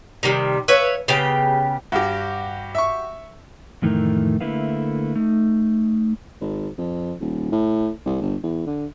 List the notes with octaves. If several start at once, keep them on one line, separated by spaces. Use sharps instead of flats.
C3 D#3 G3
B4 C#5 E5 F5
C#3 B3 G4 G5
G2 F#4 G4
E5 C#6
F2 A2 D#3 E3 A3 A#4
D3 A3 A#3 E4 B4 F5
A3 D#4
G#1
F2
D#1
A2
C2
G1
E2
D3